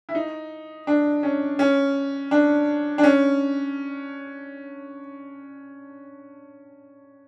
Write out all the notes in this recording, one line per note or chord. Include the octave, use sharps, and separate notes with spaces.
E4
D#4
D4
C#4
C#4
D4
D4
C#4